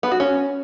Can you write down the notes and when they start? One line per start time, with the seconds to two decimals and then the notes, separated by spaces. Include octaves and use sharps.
0.03 B3
0.12 F#4
0.20 C#4